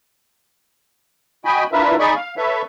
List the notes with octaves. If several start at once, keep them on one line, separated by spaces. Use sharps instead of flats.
F#4 D#5 G5 G#5 B5
D4 E4 F4 A#4 B4 E5
D#4 G#4 D5 D#5 B5 C#6
F5
A4 B4 C#5 E5